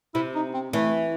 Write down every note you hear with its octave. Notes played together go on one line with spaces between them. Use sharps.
C3 E4
D#4
C4
E3 A3